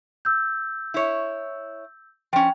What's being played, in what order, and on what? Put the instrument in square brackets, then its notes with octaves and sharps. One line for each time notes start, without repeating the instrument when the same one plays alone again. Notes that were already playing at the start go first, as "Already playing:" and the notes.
[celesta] E6 G6
[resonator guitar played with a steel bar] E4 C#5
[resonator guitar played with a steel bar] F3 C#4 [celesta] G5